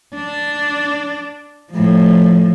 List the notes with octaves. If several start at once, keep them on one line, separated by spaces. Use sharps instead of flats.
D4
A2 F3